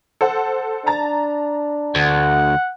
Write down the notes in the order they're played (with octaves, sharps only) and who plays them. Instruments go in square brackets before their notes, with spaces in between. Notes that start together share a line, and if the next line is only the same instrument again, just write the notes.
[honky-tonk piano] A4 C5 F#5
[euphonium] D4 [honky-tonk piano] A5 A#5 A6
[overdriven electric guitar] D2 [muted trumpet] F#5